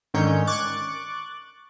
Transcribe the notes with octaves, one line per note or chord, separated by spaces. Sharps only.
G#2 D3 D#3 C#4 C#5 G6
C#6 D6 F#6 A6